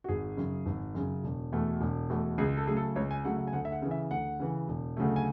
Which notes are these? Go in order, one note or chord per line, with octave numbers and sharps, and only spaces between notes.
F#4
G#1 G#4
F#2 C#3
G#1
F#2 C#3
E1
E2 B2 A3
E1
E2 B2 A3
C#2 G#4
A4
C#3 F#3 A3 G#4
A4
C#2 C#5
G#5
C#3 F#3 A3 F#5
F#5
G#5
D2 F#5
E5
F#5
C#3 E3
E5
D2 F#5
C#3 E3
E1
D2 C#3 F#3 A3
G#5